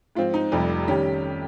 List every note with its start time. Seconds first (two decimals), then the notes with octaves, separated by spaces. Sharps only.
0.15 G#2 F3 C4 F4
0.34 D#4
0.52 F1 F2 C3 G3
0.88 D#3 G3 C#4 G4